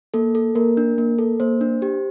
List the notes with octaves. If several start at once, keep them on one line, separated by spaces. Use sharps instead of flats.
A#3 A4
A4
A#3 A#4
D4
A#3
A4
A#3 C5
D4
G4